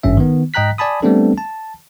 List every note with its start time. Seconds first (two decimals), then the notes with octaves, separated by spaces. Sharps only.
0.03 G#1 G2 C#4 E5
0.17 D#3 B3
0.54 G#2 D#5 G5 A#5 F#6 B6
0.78 D5 G#5 A5 B5 D#6
1.02 G3 A3 B3 C4 D4 A4
1.38 A5